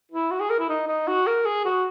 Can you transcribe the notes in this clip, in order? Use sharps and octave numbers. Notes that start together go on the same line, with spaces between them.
E4
F#4
G#4
A#4
E4
D#4
D#4
F#4
A#4
G#4
F#4